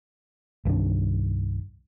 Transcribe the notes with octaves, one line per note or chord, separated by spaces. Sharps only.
C2 G2 D#3 D4